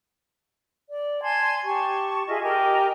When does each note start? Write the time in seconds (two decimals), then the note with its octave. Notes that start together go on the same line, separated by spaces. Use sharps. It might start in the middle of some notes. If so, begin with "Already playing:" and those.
0.88 D5
1.22 G#5 A5 C6 G#6
1.65 G4 A5 C#6
2.28 F4 G#4 D#5 E5
2.41 G4 A#4 D#5 G#5